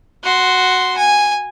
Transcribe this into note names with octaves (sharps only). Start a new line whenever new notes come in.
F#4 C6
G#5